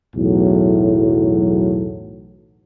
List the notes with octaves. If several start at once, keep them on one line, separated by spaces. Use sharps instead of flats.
B1 E2 A2 F#3